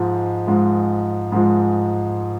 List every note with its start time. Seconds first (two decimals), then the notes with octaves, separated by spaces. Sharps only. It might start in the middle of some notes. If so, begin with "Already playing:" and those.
Already playing: G#2 F3 G#3
0.47 G#2 F3 G#3
1.32 G#2 F3 G#3